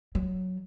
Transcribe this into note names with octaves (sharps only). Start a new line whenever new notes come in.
F#3